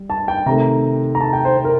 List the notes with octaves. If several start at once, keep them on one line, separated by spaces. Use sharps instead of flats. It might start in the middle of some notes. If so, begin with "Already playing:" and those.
Already playing: G3
A5
G5
C3 D#3 A3 A#5
A#5
A5
G5
C5
C5
A#4